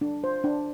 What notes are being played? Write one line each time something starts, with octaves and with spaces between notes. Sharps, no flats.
D4
C5
D4